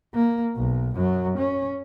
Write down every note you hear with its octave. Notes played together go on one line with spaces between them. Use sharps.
A#3
B1
F#2 F#3
C#4